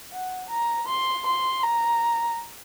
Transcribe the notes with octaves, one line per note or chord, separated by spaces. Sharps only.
F#5
A#5
C6
C6
A#5